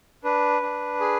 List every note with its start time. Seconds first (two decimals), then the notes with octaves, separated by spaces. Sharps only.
0.24 D4 B4
0.62 D4
1.00 G#4